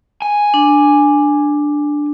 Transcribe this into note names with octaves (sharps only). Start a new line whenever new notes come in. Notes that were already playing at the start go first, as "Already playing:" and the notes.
G#5
D4